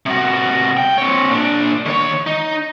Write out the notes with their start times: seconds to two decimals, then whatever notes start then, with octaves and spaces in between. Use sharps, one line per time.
0.06 C3 F#4
0.77 C2 G5
0.98 C4 C#5
1.30 A#2 D4
1.86 D#3 C#5
2.26 D#4